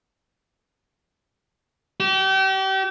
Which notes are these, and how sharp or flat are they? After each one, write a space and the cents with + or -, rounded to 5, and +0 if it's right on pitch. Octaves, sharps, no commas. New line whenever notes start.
G4 -35